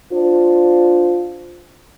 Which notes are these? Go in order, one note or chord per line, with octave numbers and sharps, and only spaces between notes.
D4 F4 C5